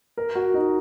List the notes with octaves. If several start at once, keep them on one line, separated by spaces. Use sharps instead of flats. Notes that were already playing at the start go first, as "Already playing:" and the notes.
A#4
F#4
D#4